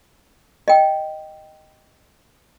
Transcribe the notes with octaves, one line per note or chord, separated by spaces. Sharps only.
D#5 G5